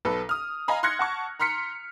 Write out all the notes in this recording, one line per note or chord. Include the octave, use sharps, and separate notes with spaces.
B1 A4 B4
D#6 F6
D#5 F5 G#5 A#5 B5
C6 F6 F#6 G#6 A#6 C#7
F#5 A5 C#6
A#5 C6 F6 B6 C#7